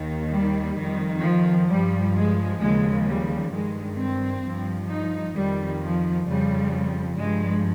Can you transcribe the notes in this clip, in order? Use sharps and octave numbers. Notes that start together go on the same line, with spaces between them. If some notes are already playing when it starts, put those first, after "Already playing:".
Already playing: D#2 D#3
G3
F2 D#3
F3
G2 F3 G3
G#3
D#2 C#3 F3 G#3
G3
G2 D#3 G#3
C4
G2 F3
D#4
F2 D#3 G3
F3
F2 C#3 F3 G3
G2 F3 G#3